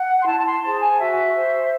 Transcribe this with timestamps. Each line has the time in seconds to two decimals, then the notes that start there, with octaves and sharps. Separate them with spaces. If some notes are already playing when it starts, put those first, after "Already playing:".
Already playing: F#5
0.21 C6
0.27 E4 A5
0.40 A5
0.46 C6
0.64 G#4 C5 A5
0.81 G#5
0.99 F#4 E5
1.35 C5